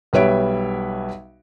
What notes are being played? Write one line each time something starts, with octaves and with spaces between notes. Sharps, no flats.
B1 G3 B4 C#5 E5 D7